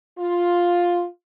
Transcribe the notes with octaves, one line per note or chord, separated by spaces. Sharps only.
F4